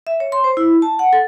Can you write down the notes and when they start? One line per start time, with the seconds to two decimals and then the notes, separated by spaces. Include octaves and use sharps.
0.07 E5
0.20 C#5
0.32 C6
0.44 C5
0.57 E4
0.82 A5
0.99 F#5
1.13 A4